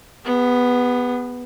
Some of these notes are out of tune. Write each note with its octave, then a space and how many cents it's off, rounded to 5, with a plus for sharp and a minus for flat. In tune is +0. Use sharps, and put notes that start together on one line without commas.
B3 +0 G#4 -45